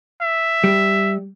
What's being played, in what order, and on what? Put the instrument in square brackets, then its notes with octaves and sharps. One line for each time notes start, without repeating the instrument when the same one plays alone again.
[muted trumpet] E5
[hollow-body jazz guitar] G3